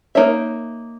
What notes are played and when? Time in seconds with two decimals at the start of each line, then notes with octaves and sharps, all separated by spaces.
0.15 A#3 D#4 A#4 C#5 E5